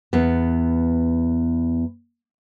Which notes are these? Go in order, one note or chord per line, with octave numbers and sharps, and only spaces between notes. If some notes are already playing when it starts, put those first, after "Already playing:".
E2 B3